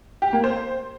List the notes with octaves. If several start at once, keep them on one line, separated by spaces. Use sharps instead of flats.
G4
A#3
C5